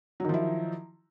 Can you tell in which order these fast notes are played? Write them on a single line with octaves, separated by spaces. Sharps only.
F#3 D#3 F3 E4